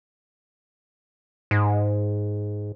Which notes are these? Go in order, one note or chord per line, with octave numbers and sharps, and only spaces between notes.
G#2